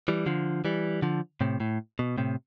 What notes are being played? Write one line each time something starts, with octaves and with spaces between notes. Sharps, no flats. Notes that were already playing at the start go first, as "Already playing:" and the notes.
E3 G3
D3 F3
E3 G3
D3 F3
A2 C3
A2
B2
A2 C3